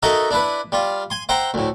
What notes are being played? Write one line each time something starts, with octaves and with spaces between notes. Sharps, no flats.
D#4 F#4 A4 A#4 D#5 E5
D4 E4 B4
G3 F4
G#5 C6
C5 E5 F#5 G5 A#5 C6
D2 A2